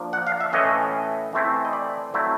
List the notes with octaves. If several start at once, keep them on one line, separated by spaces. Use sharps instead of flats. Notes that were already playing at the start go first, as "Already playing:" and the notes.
Already playing: F3 A#3 D4
F#5
F5
E5
A2 E3 A3 C#4 D#5
E3 A3 C4 E4
D#5
D5
F#3 A3 C4 E4